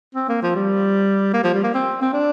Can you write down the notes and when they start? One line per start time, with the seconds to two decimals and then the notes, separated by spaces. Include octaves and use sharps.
0.15 C4
0.29 A#3
0.42 F3
0.55 G3
1.33 A#3
1.43 F3
1.54 G3
1.63 A#3
1.74 C4
2.02 C4
2.13 D4